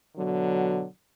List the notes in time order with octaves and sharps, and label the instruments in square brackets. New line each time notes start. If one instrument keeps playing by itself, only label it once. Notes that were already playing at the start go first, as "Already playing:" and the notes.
[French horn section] B2 D3 F#3